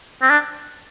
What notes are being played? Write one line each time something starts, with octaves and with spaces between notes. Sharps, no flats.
C4
D4